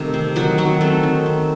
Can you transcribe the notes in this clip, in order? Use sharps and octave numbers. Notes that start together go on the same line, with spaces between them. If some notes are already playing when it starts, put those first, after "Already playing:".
Already playing: C3 D#3 A3 A4
C4
D#3 F#3 F#4
D#3 F#3 F#4
A3 C4 A4
D#3
C4